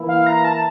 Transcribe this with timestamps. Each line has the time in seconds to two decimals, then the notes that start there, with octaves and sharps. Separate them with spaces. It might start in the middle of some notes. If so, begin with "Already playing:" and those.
Already playing: E3 A#3 E4
0.09 F5
0.27 A#5
0.44 A5